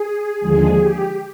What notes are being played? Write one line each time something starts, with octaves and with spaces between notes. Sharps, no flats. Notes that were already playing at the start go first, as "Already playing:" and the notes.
Already playing: G#4
D#2 D3 F3 G#3 G#4
G4